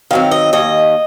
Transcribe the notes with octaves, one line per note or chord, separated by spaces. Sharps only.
D#3 F#3 C4 F5
D#5
D#2 D#5